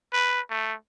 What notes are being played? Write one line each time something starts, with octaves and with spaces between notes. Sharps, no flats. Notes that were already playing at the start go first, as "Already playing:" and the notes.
B4
A3